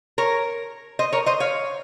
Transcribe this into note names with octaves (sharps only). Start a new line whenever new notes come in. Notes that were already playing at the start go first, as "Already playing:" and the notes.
A#4 C#5
C5 D#5
A#4 C#5
C5 D#5
C#5 F5